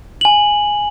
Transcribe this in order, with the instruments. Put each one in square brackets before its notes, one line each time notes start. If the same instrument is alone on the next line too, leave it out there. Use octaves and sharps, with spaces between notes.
[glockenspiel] G#5 F#7